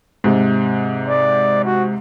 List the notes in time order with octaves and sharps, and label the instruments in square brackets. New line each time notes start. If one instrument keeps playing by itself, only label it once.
[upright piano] G#2 C3
[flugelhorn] D5
F#4